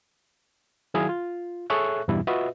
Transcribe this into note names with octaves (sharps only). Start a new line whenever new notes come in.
D#3 F#3 E4 G#4 F5 G#6
F4
G#4 A4 C#5 E5 C#6 F#6
E2 G2 B2 E3 G3 E4
F4 F#4 B4 D#5 E5